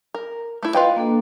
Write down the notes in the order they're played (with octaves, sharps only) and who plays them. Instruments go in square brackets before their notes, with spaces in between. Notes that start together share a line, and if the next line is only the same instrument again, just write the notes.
[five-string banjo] A#4
A3 E4
[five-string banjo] F4 B4 G5 [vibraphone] D#5 F5
[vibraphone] A#3 D4 A4